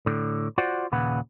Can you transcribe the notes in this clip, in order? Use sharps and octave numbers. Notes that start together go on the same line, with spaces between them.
A2 D3
F4 F#4 C5 D5 F#5
D#2 A#2 C#3 B4 F#5